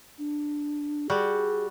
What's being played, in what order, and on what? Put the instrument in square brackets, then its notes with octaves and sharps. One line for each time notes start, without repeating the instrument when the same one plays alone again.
[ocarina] D4
[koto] G3 F#4 [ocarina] G#4